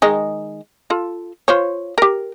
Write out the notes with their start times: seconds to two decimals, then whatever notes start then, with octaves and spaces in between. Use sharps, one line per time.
0.02 D#3 G#3 D#4
0.90 F4 A4
1.48 F4 C5 C#5
1.98 G4 A#4